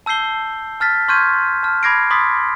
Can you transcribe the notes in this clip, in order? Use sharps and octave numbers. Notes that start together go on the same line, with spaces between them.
A5 E6 G6 C7 G7
A5 F6 A6 B6
C6 C#6 F6 G6 G#6 D#7
A5 F6
B5 D6 G#6 A#6 C7 D7
B5 C6 D6 D#6 A6 B6